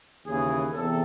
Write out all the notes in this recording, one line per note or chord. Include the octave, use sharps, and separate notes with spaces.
D#2 C#3 E3 G#4
E2 C3 A4